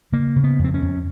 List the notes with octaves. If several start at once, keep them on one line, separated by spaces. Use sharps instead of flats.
C#3 A#3
C#3
B3
F2
C4
C#4
F2